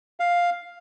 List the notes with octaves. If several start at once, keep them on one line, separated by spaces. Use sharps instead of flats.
F5